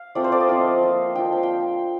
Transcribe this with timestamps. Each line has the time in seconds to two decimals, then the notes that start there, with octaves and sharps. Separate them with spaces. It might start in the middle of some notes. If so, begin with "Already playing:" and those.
Already playing: F5
0.15 A3 C4 F4 D5
0.24 C5
0.32 D5
0.40 D#5
0.49 F3 C4 F4 F5
0.83 A#3 F4
1.15 F3 A#3 D4 G5
1.32 F5
1.43 G5